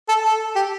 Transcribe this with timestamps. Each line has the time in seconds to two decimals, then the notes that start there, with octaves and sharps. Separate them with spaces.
0.09 A4
0.24 A4
0.56 G4